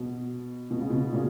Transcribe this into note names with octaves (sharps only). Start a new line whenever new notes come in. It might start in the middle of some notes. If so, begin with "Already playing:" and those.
Already playing: B2
B2
C#3
B2
A#2 C#3